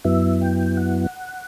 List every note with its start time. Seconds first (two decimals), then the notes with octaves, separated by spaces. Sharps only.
0.04 F#2 F#3 B3 E4 E5
0.41 G5
0.77 F#5